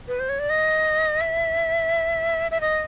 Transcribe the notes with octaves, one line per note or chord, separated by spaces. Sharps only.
B4
C5
C#5
D5
D#5
E5
E5
D#5